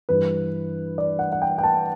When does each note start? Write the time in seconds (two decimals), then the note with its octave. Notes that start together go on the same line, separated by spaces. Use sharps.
0.09 G2 E3 G3 B4
0.98 D5
1.19 F#5
1.32 F#5
1.42 G5
1.58 G5
1.63 A5